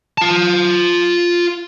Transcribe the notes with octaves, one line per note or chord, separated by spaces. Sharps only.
F4 A5